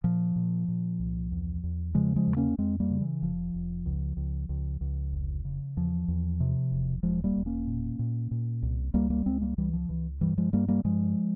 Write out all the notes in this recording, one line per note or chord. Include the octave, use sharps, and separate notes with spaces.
A#2 F3
A#2
A#2
C2
E2
E2
C#3 F3 G#3
F3 G#3
E2
A#3 C#4
F2 G#3 C4
G3 A#3
C#3
E3
F1 F3
F1
C#2
C#2
C#2
C#2
F1
C#3
E2 F3
E2
C3
E1
E1 F3 G#3
G3 A#3
E1
A#3 C#4
A#2
A#2
A#2
C2
C#2 G3 A#3
G3 A#3
C#2 G#3 C4
G3 A#3
C#2 E3 G3
F3
C#2 E3
G2 E3 G3
F3 G#3
G2 G3 A#3
G3 A#3
G2 F3 G#3